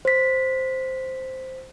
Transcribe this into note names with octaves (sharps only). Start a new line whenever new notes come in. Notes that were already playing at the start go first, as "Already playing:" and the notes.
C5 B6